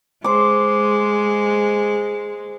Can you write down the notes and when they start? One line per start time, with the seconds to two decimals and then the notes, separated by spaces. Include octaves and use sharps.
0.24 G#3 C5 D6